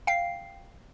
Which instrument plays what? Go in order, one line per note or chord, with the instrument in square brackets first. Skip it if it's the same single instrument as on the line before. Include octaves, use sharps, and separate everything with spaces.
[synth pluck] F5 G5 C7